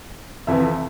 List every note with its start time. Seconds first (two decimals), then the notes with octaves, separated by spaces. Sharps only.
0.47 F2 C3 E3 E5